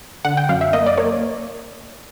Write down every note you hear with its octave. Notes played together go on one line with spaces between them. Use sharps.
D3 F#5
G5
F#2 F5
E5
A#3 D#5
D5
A#3 C#5